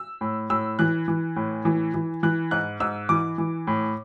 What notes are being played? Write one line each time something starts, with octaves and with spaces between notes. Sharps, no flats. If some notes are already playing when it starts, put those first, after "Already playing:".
Already playing: E6
A2
A2 E6
E3 F#6
E3
A2
E3
E3
E3 F#6
G#2 F#6
G#2 E6
E3 D6
E3
A2